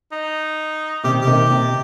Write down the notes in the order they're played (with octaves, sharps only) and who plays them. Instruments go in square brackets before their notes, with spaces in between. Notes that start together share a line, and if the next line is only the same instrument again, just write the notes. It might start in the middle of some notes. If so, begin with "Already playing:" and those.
[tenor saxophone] D#4
[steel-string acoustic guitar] C3 D#3 [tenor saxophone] G4
[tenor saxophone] G4
[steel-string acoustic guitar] C3 D#3
C3